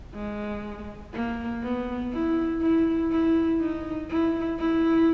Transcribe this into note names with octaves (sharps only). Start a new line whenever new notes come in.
G#3
A#3
B3
E4
E4
E4
D#4
E4
E4